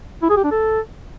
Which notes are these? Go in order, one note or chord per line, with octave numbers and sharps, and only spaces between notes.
E4
G#4
G4
D4
A4